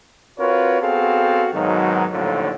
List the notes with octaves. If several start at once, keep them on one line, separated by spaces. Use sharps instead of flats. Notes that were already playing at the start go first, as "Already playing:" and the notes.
C4 F4 F#4 A#4 B4 C#5
B3 C4 F#4 G#4 A4 F5
G#2 B2 D#3 F#3
A#1 D#2 A2 D3 F3 F#3